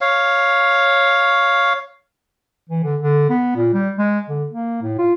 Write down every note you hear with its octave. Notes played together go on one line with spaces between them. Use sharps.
C#5 F5
E3
D3
D3
B3
A#2
G3
G#3
D3
A#3
A2
F4